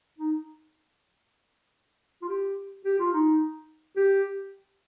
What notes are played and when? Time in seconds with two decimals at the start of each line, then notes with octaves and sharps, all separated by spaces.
0.19 D#4
2.22 F4
2.29 G4
2.85 G4
2.99 F4
3.13 D#4
3.96 G4